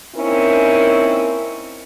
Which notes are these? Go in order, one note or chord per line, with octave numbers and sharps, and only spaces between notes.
A#3 C4 C#4 D#4 E4 A#4